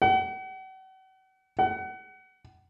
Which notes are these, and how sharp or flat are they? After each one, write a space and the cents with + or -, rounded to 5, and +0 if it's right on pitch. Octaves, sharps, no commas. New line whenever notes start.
F#5 +40
F#5 +30